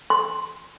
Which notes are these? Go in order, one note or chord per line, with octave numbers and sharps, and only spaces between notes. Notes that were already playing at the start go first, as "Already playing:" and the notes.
C6